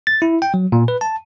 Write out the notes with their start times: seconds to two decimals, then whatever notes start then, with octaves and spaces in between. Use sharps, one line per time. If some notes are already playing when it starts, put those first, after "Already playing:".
0.07 A6
0.22 E4
0.42 G5
0.54 F#3
0.72 A#2
0.88 B4
1.01 A5